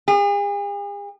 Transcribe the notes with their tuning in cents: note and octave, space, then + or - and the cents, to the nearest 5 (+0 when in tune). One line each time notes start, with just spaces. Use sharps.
G#4 -45